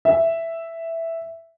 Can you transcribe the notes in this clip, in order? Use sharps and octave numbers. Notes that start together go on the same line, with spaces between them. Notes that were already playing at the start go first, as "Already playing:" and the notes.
E5